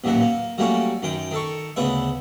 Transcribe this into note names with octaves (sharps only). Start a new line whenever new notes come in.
A1 D#2 A#2 F#3 E5 F#5
A#3
F#3 G3 A3 A#3 C#4 F#4
F#2 D#3 G5
D#3 A4 C#6
D2 C#3 B3 B4 E5